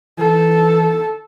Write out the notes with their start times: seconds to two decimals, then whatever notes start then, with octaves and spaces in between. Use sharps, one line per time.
0.18 E3 A4